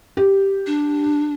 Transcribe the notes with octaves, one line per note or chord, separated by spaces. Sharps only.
G4
D4